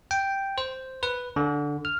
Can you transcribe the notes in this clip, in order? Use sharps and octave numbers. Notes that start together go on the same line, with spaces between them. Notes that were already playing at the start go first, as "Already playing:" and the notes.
G5
C5
B4
D3
F6